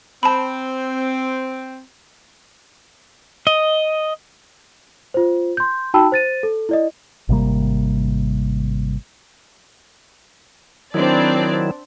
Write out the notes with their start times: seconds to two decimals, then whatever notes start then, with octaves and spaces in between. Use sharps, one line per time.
0.23 C4 A5 B5
3.47 D#5
5.14 F4 C5
5.57 C6 G6
5.94 D#4 F#4 G5 A5 B5 E6
6.12 C5 A6 D#7
6.43 A4
6.69 E4 D5 D#5
7.29 G#1 C3 G3 A#3
10.94 D#3 F#3 C4 D4 E4 D5